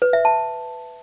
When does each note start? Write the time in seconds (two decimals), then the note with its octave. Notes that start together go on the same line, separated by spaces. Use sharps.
0.02 B4
0.13 E5
0.25 A5